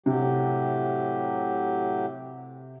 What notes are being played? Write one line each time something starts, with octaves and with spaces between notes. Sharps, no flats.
A2 C3 F#3 G4